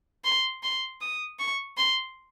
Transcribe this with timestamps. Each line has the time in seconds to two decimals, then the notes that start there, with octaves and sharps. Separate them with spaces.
0.25 C6
0.63 C6
1.01 D#6
1.39 C#6
1.77 C6